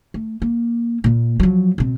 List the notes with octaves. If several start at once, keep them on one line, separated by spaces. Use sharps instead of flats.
A3
A#3
A#2 A#3
F3 F#3
B2 C4